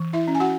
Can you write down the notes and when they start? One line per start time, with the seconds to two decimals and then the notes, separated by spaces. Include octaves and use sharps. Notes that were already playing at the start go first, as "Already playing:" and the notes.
Already playing: E3
0.13 E4 E5
0.28 C#4
0.35 G#5
0.40 F#4 F#5